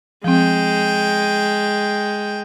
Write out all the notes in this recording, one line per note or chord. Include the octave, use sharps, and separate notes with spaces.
F3 G#3 C4 G5